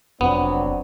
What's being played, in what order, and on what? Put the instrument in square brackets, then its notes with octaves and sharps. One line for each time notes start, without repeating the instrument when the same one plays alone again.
[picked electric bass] F1 [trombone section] F#3 C4 D4 [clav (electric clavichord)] B3